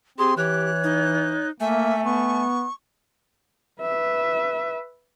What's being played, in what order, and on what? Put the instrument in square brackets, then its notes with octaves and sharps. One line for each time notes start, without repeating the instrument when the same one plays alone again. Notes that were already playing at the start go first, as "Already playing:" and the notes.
[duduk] C4 [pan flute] G4 [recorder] G#4 [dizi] C6
[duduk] E3 [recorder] G4 [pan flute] C#5 [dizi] F#6
[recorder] D#4
[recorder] A3 [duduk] A#3 [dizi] E5 [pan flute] G#5
[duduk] B3 [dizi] C#6
[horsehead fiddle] B4 E5